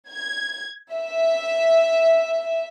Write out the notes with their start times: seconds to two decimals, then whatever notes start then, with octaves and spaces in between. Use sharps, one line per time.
0.11 G#6
0.94 E5